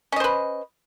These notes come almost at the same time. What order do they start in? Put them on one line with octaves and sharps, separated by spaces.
C#4 D#5 C5 B4